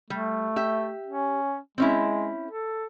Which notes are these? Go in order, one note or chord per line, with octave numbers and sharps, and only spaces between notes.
G3 A3
G4 E5
C#4
G#3 C4 C#4 E4
A4